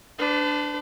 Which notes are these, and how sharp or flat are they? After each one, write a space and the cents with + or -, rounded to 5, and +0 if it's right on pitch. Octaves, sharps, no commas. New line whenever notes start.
D4 +0 B4 +45